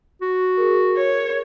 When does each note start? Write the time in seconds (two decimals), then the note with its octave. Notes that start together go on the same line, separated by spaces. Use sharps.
0.22 F#4
0.57 G#4 A#4
0.96 C#5